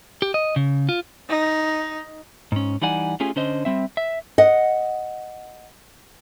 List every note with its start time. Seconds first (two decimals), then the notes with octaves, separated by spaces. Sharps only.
0.22 G4
0.34 D#5
0.56 C#3
0.89 F4
1.29 D#4
2.52 G#2 C#4
2.82 E3 G3 D#4 D5 F#5 G#5
3.20 A3 C#4 F4 G4 G#4 G#5
3.36 D3 C#4 C5 D#5
3.65 G3 C4 E5
3.97 E5
4.38 D#5 F#5